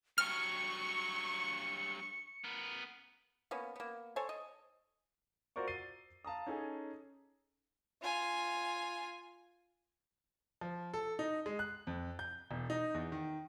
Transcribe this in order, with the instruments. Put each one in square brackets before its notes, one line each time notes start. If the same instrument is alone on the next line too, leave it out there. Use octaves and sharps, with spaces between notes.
[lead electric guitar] G2 F#3 [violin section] C#6 [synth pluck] F6 [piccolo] C#7
[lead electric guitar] B3 A#4
[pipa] A#3 B3 C#4
A#3 B3
A4 C5 C#5 G#5
D#5
[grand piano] F4 F#4 A#4 C5 D5 C#6
A6 C7 D#7 G7
F5 A5 A#5 D#6
C#4 D#4 G#4 A4 G#5
[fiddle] F4 G#5
[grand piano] F3
A4
D#4
G#3
F#6
F2
G6
E1
D#4
E2
D#3